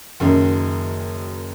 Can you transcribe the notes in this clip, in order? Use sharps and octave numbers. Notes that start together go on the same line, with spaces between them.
F#1 F#2 D#3